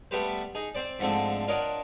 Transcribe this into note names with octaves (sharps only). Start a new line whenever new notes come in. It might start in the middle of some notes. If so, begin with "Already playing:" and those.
G3 A3 B3 G4 B4 C5
D#4 G#4
C4 C5 D5
G#2 D3 F3 A3 C4 D4
D4 F4 A#4 C#5 D#5 F#5